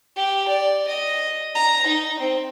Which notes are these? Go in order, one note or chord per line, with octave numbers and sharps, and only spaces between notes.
G4
D5
D#5
A#5
D#4
C4